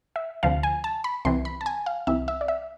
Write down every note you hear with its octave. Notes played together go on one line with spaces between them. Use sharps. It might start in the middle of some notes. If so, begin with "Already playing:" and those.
E5
D2 C3 F3 F5
G#5
A5
B5
C2 C3 E3 C6
B5
A5
G#5
F5
C2 C3 E3 E5
E5
D5
E5